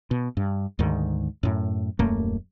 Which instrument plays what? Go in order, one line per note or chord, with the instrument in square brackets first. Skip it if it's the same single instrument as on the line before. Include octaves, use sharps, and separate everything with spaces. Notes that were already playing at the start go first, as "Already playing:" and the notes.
[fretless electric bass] B2
G2
D2 G#2 D#3
F#2 A2
D#1 F#2 A3 A#3